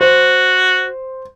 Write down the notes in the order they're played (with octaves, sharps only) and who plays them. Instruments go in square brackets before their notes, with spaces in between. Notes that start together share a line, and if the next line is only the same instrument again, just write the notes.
[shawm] F#4 [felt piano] C5